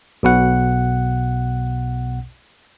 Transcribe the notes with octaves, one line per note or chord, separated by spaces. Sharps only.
B1 B2 F#5